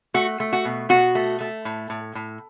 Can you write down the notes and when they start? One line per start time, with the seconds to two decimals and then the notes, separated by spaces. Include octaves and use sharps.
0.14 A3 F#4
0.40 A3
0.53 F#4
0.65 B2
0.89 B2 F#4
1.15 A3
1.40 A3
1.65 A2
1.90 A2
2.15 A2